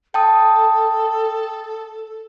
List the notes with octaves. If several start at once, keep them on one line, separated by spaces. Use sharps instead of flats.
A4 G5 A5 D#6